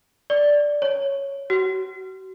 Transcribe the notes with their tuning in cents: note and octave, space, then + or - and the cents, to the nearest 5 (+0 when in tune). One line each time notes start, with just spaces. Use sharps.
D5 +0
C#5 +0
F#4 +35